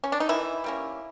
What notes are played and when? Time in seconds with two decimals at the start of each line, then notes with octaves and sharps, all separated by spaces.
0.04 C#4
0.12 D4
0.20 D#4
0.29 D#3 E3 E4
0.64 G3 A#3 C#4